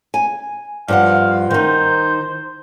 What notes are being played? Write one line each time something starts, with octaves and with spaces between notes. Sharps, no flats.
G#5
G2 F3 F5 F#5
D#3 D#4 C5